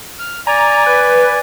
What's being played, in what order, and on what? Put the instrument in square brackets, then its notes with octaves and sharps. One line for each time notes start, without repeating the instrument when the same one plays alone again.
[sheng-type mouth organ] F6
[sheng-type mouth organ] D5 G#5 [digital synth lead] A#5
[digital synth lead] B4